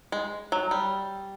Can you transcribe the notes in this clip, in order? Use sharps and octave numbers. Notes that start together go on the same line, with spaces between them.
G#3
F#3
G3